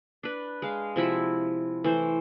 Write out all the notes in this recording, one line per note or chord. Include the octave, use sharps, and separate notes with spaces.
D4 B4
G#3 F5
C3 F3 E4 B5
E3 A3 C5